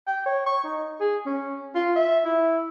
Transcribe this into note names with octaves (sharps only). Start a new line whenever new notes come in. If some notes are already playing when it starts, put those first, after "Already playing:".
G5
C#5
C#6
D#4
G#4
C#4
F4
E5
E4